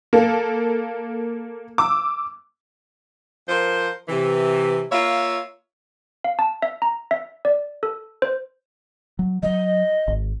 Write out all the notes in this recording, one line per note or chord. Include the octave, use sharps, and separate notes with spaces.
A#3 A4
D6 E6
F3 A#4 C5
C3 E3
A#3 F4 C#5 E5
F5
A5
E5
A#5
E5
D5
A4
C5
F#3
F3 F#3 D#5
G#1